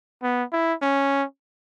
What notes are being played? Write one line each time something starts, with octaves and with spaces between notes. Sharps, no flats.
B3
E4
C#4